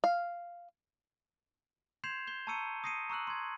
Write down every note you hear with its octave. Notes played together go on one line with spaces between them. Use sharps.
F5
C6 G6 G#6 C7 E7 F7
G6 C7 G7
A5 A#5 C#6 E6 C#7 D#7
D#6 A#6 C7 C#7 D#7
A#5 C#6 E6 F#6 F#7
C6 G#6